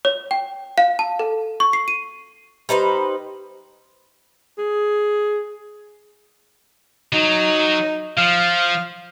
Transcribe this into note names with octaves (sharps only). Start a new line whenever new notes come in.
C#5
G5
F5
A5
A4
C#6
C7
D#7
G3 D#4 B4 C5
G#4
F#3 D#4
F3 F5